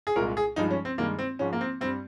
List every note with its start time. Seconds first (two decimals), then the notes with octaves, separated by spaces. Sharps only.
0.07 G#4
0.16 C2 A#2 G#3 A#4
0.37 G#4
0.56 G2 F3 G#3 D#4
0.71 C#4
0.85 C4
0.98 G2 D#3 G#3 A#3
1.19 C4
1.39 G#2 F3 G#3 C#4
1.53 A#3
1.61 C4
1.81 G2 C4
1.84 G3